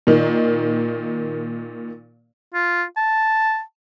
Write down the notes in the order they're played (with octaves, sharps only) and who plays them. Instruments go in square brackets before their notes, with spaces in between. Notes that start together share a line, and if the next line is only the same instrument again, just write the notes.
[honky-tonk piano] A#2 D#3
[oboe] F4
A5